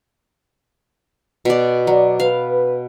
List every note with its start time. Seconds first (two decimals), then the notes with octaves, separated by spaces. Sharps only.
1.45 B2 D5
1.87 F#3 D5
2.20 B4 F5